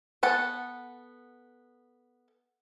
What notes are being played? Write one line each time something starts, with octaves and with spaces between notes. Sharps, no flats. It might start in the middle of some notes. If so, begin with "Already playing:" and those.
B3 A4 F#5 A5